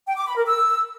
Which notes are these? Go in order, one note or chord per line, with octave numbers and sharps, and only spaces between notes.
G5
D6
B5
A#4
E6